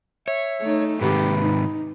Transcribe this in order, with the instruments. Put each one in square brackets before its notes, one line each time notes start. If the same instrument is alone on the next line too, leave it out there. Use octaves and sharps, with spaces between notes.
[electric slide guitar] C#5 [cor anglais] E5
[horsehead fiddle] A3 D#4
[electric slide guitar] G#2 C3 D#3 [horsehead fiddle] G4 [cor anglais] B4
[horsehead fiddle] D#4